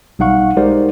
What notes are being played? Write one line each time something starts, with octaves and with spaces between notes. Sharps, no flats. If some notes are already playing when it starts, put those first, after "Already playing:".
B1 G3 D#4 F5 F#5 C#6
G#3 D#4 G4 A#4 C5 D5